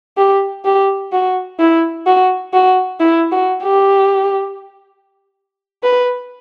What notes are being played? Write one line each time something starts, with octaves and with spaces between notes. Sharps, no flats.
G4
G4
F#4
E4
F#4
F#4
E4
F#4
G4
B4